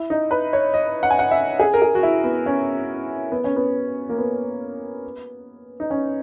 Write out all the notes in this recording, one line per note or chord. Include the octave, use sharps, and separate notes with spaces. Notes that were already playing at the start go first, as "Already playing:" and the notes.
Already playing: E4
D#4
B4
C#5
D#5
F#5
G#5
F#5
E5
G#4
A#4
G#4
F#4
E4
B3
C#4
B3
C#4
B3
A#3
B3
D#4
C#4